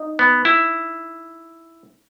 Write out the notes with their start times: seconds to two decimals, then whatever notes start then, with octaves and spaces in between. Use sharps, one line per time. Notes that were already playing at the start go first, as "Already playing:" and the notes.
Already playing: D#4 D#5
0.19 B3
0.45 E4